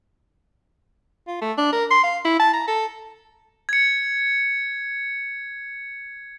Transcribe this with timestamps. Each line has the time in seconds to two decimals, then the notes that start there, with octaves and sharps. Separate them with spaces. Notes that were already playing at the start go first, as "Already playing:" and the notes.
1.27 F4
1.42 A3
1.58 D4
1.73 A#4
1.91 C6
2.04 F5
2.25 E4
2.40 A5
2.53 A#5
2.68 A4
3.69 G#6 C#7